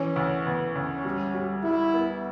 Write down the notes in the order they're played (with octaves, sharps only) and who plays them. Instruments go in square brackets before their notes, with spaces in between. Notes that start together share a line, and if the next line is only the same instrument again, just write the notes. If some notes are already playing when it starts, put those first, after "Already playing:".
Already playing: [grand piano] E3 [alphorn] C#4
[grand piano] D2
[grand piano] D2 [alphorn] B3
[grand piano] D2 [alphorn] C#4
[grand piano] G3
G3
[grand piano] G3 [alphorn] E4
[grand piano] B3